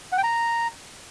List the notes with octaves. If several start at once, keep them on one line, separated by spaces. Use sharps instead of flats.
F#5
G5
A#5